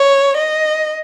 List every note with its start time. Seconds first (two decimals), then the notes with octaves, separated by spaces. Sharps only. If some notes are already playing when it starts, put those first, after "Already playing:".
Already playing: C#5
0.37 D#5